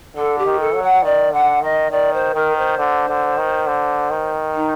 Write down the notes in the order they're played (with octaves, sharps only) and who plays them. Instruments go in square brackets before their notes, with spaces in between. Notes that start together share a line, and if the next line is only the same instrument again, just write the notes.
[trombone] D3 [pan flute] A4
[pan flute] G4
[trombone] D#3
[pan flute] A4
[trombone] F#3
[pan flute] F#5
[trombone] D#3 [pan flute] D5
[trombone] D3 [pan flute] F#5
[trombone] D#3 [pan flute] D#5
[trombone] D#3 [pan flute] D5
[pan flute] C5
[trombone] D#3 [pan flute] A#4
[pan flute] C5
[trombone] D3
D3
D#3
D3
D#3
[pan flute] D#4